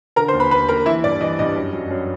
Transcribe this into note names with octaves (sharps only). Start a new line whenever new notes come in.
D3 A#4 A#5
C5 C6
D#2
B4 B5
D#2 B4 B5
D#2 A#4 A#5
E3 E4 E5
G2 D5
E3 D#5
G2 D#5
F#2
F#2
F#2